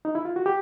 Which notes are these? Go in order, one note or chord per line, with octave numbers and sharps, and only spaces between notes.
D#4
E4
F4
F#4
G4